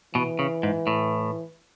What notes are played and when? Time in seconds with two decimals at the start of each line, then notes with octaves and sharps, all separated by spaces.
0.15 B2 E3
0.39 C#3
0.63 G#2
0.87 A2